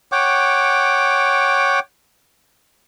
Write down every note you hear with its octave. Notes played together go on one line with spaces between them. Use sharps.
C#5 F#5 G5 D6